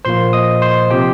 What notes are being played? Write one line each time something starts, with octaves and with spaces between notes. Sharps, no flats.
A#2 F3 A#3 C5 C6
D#5 D#6
C5 C6
C3 F3 C4 G4 G5